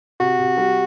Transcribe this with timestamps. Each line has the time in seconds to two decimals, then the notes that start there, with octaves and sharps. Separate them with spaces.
0.20 C3 F#4
0.39 C3
0.57 G3